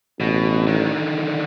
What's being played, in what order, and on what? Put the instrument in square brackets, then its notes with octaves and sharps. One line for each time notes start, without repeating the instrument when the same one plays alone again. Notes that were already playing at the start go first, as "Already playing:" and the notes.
[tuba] A1 [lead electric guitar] B2
[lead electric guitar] D3 D#3